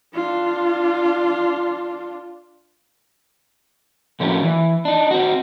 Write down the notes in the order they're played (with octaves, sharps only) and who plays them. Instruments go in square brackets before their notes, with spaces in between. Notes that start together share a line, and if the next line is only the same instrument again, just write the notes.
[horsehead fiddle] D4 F4
[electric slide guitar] A2 D3 F3 A#3 C#4 F#4
E3
D4 D#4
C4 F#4